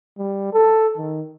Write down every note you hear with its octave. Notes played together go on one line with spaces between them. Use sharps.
G3
A4
D#3